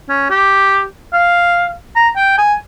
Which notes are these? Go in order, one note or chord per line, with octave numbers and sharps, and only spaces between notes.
C#4
G4
F5
A#5
G5
G#5